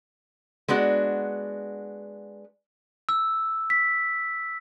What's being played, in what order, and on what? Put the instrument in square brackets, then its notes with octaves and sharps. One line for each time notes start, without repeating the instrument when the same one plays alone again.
[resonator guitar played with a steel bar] G#3 B3 D4 F#4
[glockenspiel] E6
B6